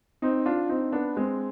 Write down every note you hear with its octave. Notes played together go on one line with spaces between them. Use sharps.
C4 D#4
D4 F4
C4 D#4
B3 D4
G#3 C4